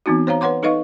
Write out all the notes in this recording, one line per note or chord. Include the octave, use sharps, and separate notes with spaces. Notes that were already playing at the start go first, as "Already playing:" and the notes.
E3 B3 C4 D#4 F#4
C5 C#5 F5 A#5
B4 C#5 F#5 C6 D6
D#4 A4 B4 D#5 F5 C#6